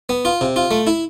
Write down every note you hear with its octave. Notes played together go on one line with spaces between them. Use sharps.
B3
F4
C3
F4
A3
E4